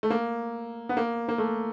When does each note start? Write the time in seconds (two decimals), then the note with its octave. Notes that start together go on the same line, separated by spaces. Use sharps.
0.03 A3
0.10 A#3
0.89 B3
0.97 A#3
1.29 A#3
1.38 A3